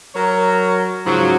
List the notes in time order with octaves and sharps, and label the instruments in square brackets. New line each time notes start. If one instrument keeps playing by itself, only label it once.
[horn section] F#3 A#4 C#5
G#2 C#3 F3 F#3